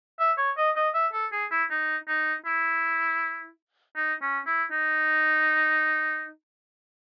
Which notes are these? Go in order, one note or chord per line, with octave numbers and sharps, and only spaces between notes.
E5
C#5
D#5
D#5
E5
A4
G#4
E4
D#4
D#4
E4
D#4
C#4
E4
D#4